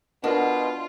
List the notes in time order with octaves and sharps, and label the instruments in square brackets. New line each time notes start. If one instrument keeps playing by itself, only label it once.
[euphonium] B2 [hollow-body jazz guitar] D4 [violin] F4 [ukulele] A#4 D#5 F#5